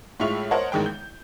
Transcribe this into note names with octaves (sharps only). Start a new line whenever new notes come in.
A2 G#3 F4 E5 C#6 F7
A#4 C5 C#5 D#5 F#5 A5
A1 G#2 D#3 G#3 G5
G6